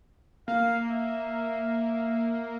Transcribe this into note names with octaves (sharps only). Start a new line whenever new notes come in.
A#3 F5
E5